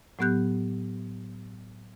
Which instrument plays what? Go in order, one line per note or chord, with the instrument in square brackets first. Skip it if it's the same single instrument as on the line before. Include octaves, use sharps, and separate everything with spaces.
[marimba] A2 F#3 B3 G4 F#6 G6